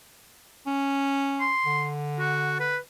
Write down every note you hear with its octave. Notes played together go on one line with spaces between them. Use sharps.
C#4
C6
D3
F#4
B4